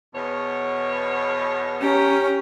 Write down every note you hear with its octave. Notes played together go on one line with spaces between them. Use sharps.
E2 B2 C#5
C#4 G4 A#5